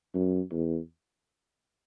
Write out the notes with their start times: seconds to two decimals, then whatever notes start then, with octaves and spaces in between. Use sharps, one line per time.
0.14 F#2
0.52 E2